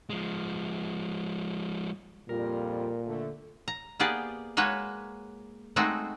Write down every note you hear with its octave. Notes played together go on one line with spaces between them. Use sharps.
F3 G#3
F2 A#2 G3 F4 A#4
D3 A3
A#5
A#3 B3 G4 G#4 D5
G#3 A#3 F#4 B4 C#5
G#3 A3 C4 D#4 F#4